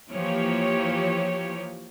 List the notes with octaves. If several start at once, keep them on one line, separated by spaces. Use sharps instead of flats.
E3 F3 A#3 G4 C#5